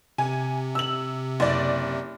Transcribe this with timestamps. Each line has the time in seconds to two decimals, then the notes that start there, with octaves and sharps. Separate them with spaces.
0.18 C3 G#5
0.75 E6 F#7
1.40 F#1 D5